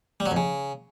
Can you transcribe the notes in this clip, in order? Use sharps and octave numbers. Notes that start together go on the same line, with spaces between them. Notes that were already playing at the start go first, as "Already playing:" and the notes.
G3
F#3
F2
C#3